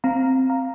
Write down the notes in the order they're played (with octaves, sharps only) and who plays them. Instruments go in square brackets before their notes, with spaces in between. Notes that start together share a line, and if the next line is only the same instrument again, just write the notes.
[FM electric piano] C4 F5 A#5
F5 A#5